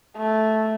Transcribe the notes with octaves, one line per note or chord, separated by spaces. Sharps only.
A3